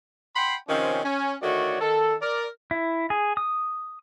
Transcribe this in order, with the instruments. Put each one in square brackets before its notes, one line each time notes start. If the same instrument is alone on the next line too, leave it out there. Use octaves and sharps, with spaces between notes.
[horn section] F#5 G5 B5 C6
C3 D#3 F3 C4 C#4
C#4
D3 D#3 A3 F#4 C#5 D5
D#3 A4
A#4 D5
[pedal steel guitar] E4
G#4
D#6